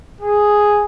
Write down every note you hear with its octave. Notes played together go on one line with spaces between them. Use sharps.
G#4